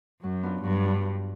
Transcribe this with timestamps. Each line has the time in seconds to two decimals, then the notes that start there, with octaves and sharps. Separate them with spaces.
0.22 F#2 F#3
0.43 B3 D4 F4
0.63 G2 F#3
0.83 B3 D4 F4